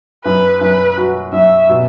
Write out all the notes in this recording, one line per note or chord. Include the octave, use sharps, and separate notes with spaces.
F#2 B4
F#2 B4
F#4
F#2 E5
B2